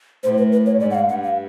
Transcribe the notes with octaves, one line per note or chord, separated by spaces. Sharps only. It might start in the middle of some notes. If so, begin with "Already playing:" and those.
A2 C5
B4
B4
C#5
G#2 D5
F#5
F5
G2 F#5
F5